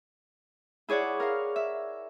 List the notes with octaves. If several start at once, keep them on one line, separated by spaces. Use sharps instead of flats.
E4 G#4 C#5 D5 F#5
A#4 F5
E5